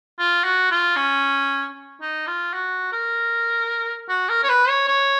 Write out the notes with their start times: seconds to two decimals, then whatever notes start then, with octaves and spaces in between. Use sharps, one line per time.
0.19 F4
0.44 F#4
0.71 F4
0.96 C#4
2.01 D#4
2.27 F4
2.54 F#4
2.93 A#4
4.09 F#4
4.29 A#4
4.43 C#5
4.49 B4
4.69 C#5
4.88 C#5